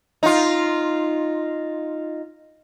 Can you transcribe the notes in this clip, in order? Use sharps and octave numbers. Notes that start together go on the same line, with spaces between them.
D#4 F4